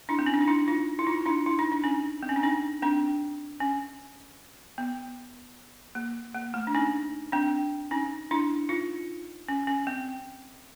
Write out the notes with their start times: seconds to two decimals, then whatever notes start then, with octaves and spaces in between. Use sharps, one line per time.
0.09 D4 E4
0.19 C4
0.26 C#4
0.34 D4
0.41 D#4
0.47 D4 E4
0.68 D#4 F4
0.99 E4
1.07 D#4 F4
1.26 D4 E4
1.46 E4
1.59 D#4
1.72 D4
1.84 C#4 D#4
2.23 C4
2.29 C#4
2.36 D4
2.43 C#4 D#4
2.82 C4 D4
3.60 C#4
4.78 B3
5.95 A#3
6.34 A#3
6.54 A3
6.67 D4
6.75 C#4 D#4
7.32 C4 D4
7.91 C#4 D#4
8.31 D4 E4
8.69 D#4 F4
9.48 C#4
9.67 C#4
9.87 C4